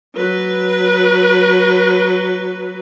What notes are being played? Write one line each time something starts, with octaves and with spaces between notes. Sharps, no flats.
F#3 B4